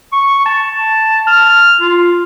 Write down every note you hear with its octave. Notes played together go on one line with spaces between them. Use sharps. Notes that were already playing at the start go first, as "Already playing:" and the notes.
C#6
A5
F6
F4